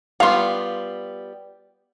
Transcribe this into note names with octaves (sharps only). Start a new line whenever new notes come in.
G3 B3 F4 F5 C6